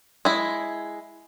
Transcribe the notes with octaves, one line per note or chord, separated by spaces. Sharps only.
G#3 E4